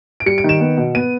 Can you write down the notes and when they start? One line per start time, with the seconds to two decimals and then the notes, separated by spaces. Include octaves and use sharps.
0.20 D7
0.26 G3 C#7
0.38 D7
0.44 D#3 E7
0.60 B3
0.78 B2
0.95 B3 D#7